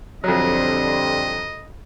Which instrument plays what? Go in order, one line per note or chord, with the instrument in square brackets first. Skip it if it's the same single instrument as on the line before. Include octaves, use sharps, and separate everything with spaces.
[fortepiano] F2 F#3 [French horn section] D3 G3 C4 [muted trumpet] D#5